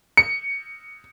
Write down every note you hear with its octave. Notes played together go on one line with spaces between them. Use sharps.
C#7